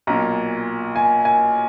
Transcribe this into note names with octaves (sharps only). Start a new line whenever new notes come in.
B1 A#2 A#5
G#5
G#5